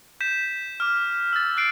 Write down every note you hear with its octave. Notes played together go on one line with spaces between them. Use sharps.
G6 B6 E7
D6 F6
E6 A6
F#6 C7 D7